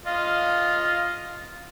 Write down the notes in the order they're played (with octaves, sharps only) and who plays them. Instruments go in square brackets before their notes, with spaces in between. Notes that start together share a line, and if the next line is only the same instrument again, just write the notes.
[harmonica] F4 D#5 F5